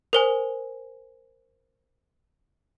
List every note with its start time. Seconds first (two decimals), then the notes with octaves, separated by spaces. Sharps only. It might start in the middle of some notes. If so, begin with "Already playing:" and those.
0.13 A#4 C5 G#5